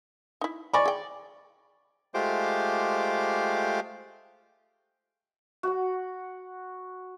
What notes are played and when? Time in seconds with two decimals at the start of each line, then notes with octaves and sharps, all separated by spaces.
0.41 D#4 E4
0.74 D5 D#5 G#5 B5 C#6
0.86 G#4 G5
2.14 G#3 A3 F4 G4 C5 D6
5.63 F#4 F#5